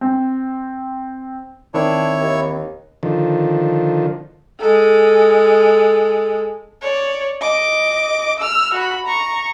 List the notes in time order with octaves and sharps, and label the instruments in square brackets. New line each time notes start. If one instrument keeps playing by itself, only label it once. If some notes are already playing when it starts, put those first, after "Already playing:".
[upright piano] C4
[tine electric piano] D#3 C4 [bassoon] D4 [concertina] E4 C#5
[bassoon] D#2
[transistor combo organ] D3 D#3 F3
[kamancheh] G#3 A4
C#5 D5
D#5 D6
E6 F6
F#4 B5
A#5 C#6